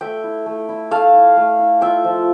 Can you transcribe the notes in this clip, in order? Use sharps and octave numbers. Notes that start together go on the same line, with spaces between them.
A3 E5 G5
E4
A3
E4
A3 F5 A5
E4
A3
E4
F4 E5 G5
F3